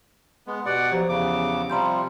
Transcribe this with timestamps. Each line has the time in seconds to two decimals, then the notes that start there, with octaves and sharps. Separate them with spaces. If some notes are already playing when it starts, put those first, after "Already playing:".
0.47 G#3 B3
0.66 B2 G4 D5 F#5
0.91 F3 F#3 G4 C5
1.09 E2 C#3 D6
1.70 C3 F3 G3 A#5 C6 G6